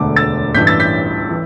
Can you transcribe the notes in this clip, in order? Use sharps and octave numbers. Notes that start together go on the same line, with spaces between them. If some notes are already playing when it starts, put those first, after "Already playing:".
Already playing: E1 D2 D3 A3 D6
E6 A6
A1 G2 E3 G6 B6
E6 A6
G6 B6
E3